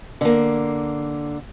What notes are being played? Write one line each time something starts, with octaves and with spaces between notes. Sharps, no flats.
D3 A#3